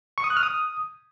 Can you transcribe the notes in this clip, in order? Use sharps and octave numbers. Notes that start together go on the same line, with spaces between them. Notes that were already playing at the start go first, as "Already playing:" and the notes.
C#6
D#6
F#6
F6
D#6